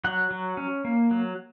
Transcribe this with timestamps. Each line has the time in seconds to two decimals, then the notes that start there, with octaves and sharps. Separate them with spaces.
0.04 F#3 F#5
0.31 F#3
0.57 C#4
0.85 A#3
1.11 F#3